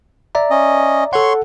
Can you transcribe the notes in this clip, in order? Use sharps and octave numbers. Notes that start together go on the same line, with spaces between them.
D5 E5 A#5
C#4 D#5
A4 C#5 F#5 C6 C#6